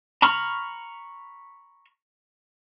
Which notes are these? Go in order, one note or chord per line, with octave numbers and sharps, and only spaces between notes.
A#5 B5 C#6 F6